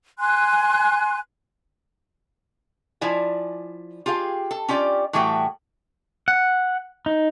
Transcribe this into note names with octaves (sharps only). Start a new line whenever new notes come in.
G#5 C6 F#6
F3 E4 D5 G#5
F4 G4 G#4 F5
A4
C#4 F4 G4 D5
A2 E3 G3 A3 F#4 G5
F#5
D#4